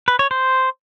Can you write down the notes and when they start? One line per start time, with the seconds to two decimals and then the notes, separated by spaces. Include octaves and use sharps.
0.08 B4
0.19 C#5
0.31 C5